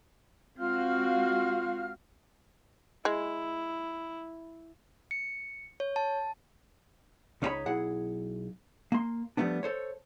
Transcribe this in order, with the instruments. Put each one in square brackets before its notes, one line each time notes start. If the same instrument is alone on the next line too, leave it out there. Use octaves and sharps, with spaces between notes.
[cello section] G#3 C4 F#4 [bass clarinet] F4 [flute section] F5 F6
[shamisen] G#3 [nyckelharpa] E4
[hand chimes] C#7
C#5
A5
[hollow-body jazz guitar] C#2 C#4 D#4 G4 C#5 B5
B1 E4 G#4 F#5
A#3 C6
F3 G3 A3 B3 D4
A4 C5 C#5